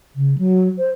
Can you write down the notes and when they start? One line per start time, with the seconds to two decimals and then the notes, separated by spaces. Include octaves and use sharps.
0.15 C#3
0.38 F#3
0.78 C5